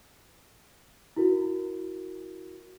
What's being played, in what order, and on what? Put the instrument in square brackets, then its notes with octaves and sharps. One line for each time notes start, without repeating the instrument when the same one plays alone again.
[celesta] E4 F#4 A#4